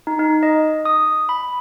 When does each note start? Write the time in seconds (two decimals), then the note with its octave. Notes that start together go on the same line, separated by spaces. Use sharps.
0.07 D#4
0.19 D#4
0.43 D#5
0.85 D#6
1.29 B5